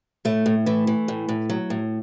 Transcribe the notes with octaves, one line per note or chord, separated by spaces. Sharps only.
A2 A3
A2
E3 A3
E3
A2
A2
F#3
A2